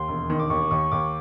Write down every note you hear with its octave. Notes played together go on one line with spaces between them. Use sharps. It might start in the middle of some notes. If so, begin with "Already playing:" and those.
Already playing: D#2 C6
E1
D#3
D6
D#2 C#6
D#2 C#6
D#2 D6